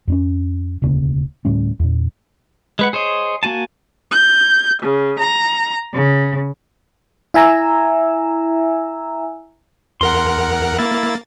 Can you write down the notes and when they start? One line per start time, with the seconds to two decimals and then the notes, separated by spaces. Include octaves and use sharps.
0.08 F2 C4 C#4
0.82 E1 D2 C#3 A#3
1.45 D2 A2 G3 C#4
1.80 E2 A#2
2.79 G#3 B4 F#5
2.93 G#4 C5 C#5 D#5
3.43 A#3 F#4 G#5 A5
4.11 G6
4.82 C#3
5.17 A#5
5.93 C#3
7.34 E4 E5 G#5 A#5 E6
10.01 E2 A#4 F#5 C6
10.79 A#3 E4 A6